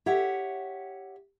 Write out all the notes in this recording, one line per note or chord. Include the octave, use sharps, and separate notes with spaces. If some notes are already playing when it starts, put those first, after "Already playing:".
G4 C#5 E5 F#5